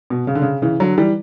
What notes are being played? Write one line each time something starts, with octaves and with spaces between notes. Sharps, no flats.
B2
C#3
D3
C#3
C#3 E3
D3 F#3
E3 G3